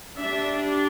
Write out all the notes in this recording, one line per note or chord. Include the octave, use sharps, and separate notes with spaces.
G3 D4 E5